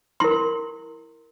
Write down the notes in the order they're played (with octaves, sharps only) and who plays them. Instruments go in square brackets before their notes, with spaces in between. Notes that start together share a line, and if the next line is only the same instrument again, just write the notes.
[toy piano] E4 A#4 C6